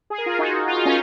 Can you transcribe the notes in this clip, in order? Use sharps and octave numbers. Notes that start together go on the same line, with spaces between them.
G#4
A#4
F4 G#4
D#4 F#4
F4
D#4
C#4 F4